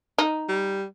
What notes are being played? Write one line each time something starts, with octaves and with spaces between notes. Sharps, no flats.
D#4
G3